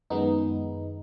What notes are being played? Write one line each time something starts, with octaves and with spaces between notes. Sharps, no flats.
F#2 D#3 G#3 B3 D#4